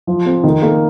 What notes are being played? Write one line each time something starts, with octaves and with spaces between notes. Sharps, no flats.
F3
C4
D#3
A#3